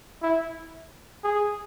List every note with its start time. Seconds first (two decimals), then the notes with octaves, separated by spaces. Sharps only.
0.22 E4
1.23 G#4